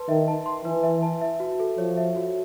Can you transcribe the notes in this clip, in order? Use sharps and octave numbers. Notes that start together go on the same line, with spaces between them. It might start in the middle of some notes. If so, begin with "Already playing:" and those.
Already playing: B4 A5 C6
D#3 E5
A5
C6
E3 B4
E5
A5
E5
F#4
A4
F3 C#5
E5
F#4